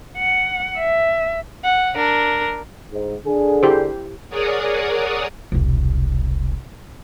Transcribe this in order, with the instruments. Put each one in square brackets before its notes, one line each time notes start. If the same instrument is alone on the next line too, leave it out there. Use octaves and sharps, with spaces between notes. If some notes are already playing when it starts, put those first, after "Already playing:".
[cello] F#5
E5
[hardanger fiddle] F#5
D4 A#4
[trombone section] G#2
D3 G#4
[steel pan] E4 G4 C5
[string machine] G#4 A#4 C#5 D5 F#5 D#6
[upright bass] E1 C2